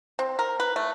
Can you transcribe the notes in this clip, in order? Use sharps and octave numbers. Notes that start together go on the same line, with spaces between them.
C4
A#4
B4
A3